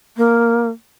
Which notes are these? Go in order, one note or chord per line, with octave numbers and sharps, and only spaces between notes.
A#3